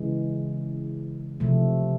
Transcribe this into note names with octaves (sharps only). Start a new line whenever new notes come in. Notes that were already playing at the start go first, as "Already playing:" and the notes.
Already playing: C#3 E3 G#3
C3 F3 A3